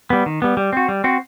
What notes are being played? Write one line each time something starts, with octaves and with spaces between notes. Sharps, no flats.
G3 B3
D#3
G3 B3
G3
C4 F#4
G3
C4 F#4